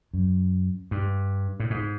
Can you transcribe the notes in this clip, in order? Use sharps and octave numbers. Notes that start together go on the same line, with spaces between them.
F#2
G2
A2
G#2